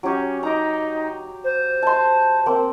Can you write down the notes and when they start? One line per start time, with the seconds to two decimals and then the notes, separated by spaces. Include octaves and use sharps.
0.03 F#3 C#4 G4
0.43 D#4 A#5 D6
1.44 C5
1.82 A5 C6
2.46 A#3 C4